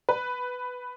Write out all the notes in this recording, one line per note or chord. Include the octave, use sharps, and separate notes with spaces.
B4